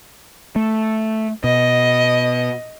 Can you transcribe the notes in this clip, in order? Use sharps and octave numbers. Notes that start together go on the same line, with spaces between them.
A3
B2 D#5